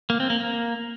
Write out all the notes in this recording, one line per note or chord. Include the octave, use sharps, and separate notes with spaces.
A#3
C4
A#3
A#3